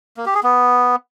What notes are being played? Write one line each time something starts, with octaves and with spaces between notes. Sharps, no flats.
A#3
G4
G#4
B3